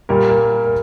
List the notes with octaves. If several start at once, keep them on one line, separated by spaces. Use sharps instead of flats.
A#2 G3 A#4
A#4
A#4